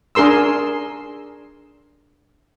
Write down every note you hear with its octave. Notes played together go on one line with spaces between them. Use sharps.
D4 G#4 A#4 C6 E6